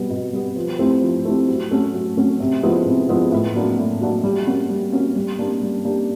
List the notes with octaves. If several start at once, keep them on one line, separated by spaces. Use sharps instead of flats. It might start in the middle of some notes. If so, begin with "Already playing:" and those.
Already playing: B2 G3 B3
B2
G3 B3
F3
A3 C4 E4 G4
F3
A3 C4 E4 G4
F#3
A3 C#4 F#4
F#3
A3 C#4 F#4
C3
F3 G#3 B3 E4
C3
F3 G#3 B3 E4
A2
F#3 A#3 D4 F#4
A2
F#3 A#3 D4 F#4
G3
A#3 C#4 F#4
G3
A#3 C#4 F#4
G3
A#3 D4 G4
G3
A#3 D4 G4